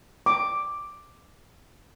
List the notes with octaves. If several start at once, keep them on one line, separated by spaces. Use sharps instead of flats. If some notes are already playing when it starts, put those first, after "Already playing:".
D6